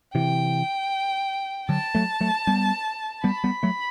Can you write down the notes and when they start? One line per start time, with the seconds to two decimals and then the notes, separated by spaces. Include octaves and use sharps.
0.15 C3 E3 G5
1.69 D3 F#3 A5
1.95 F#3 A3
2.20 F#3 A3
2.47 G3 B3
3.24 G3 B3 B5
3.44 G3 B3
3.63 F#3 A3